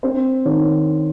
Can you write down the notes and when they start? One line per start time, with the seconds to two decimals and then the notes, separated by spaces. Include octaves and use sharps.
0.03 C4 C5
0.45 D#3 C#5